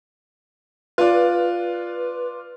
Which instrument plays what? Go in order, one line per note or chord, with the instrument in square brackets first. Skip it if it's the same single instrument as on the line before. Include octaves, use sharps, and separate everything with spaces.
[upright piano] F4 D5 [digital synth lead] B4